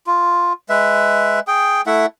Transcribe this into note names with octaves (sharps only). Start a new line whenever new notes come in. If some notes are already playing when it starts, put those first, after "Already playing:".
F4
G#3 B4 E5
G#4 G5
A3 E4 E5 F#5